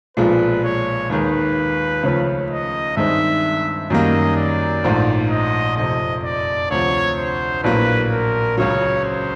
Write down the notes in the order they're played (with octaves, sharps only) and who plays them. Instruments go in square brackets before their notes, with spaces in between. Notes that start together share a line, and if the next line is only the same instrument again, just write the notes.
[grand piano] B1 A#2 F3 G#3 [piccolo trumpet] B4
[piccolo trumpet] C#5
[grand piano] D#2 D#3 G#3 [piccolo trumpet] B4
[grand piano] C#2 C#3 F3 A3 C#4
[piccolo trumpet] D#5
[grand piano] G2 D#3 G#3 C4 D#4 [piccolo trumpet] E5
[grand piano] F#2 D#3 G3 A#3 [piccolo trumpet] D#5
[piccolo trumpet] D5
[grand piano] A#1 G#2 F3 A3
[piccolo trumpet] D#5
[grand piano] F1 F2 C3 [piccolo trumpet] D#5
[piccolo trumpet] D5
[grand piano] D2 C3 F3 [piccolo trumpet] C#5
[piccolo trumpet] C5
[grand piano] A#1 A2 F#3 A#3 [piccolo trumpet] B4
[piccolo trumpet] A#4
[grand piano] C#2 C#3 F#3 [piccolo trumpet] C#5
[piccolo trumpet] C5